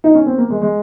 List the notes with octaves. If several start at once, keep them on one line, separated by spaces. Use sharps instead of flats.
D#4
C#4
C4
A#3
G#3
G#3